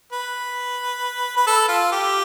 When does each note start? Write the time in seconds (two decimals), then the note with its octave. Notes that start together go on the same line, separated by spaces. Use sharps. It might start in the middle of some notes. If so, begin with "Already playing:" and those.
0.12 B4
1.37 B4
1.47 A4
1.68 F4
1.92 G4